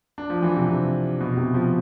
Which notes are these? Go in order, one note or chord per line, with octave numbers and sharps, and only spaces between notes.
D4
F3
E3
C3
C3
B2
C3
F3